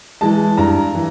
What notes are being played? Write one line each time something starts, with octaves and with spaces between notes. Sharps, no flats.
E3 G#3 A5
G2 A#5
E3